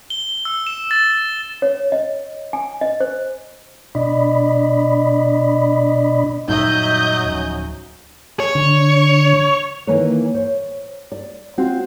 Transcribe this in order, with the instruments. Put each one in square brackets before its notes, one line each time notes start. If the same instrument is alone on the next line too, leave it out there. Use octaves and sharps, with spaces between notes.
[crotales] G7
E6
E7
A6
[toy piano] C#5
D#5
G#5
D#5
C5
[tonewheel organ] B2 D4 D5 D#5 B5
[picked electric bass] F#2 A#2 G3 [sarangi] F#3 [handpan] D#4 E5 [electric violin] D#5 G6
[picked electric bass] D1 F3 C#4
[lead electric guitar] C#5
[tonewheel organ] D3
[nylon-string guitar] D#3 E3 A#3 A#4 B4 C#5
C5 C#5
D5
C4 F4 F#4